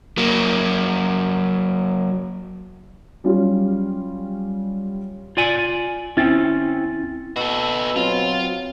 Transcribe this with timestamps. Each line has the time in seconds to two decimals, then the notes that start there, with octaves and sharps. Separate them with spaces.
0.17 F#3 A#3
3.24 F#3 G3 C#4 F4
5.37 F4 D5 G#5
6.17 D2 C4 C#4 E4 A6
7.36 B2 F#4 A4 E6
7.96 F#3 C4 F4